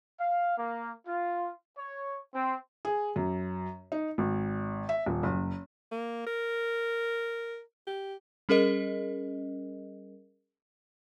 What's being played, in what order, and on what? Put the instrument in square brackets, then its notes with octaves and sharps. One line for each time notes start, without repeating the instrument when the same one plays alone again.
[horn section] F5
A#3
F4
C#5
C4
[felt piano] G#4
F#2
D#4
G#1
E5
D#1
F#1
[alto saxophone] A#3
A#4
G4
[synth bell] G3 C#4 G#4 A#4 D#5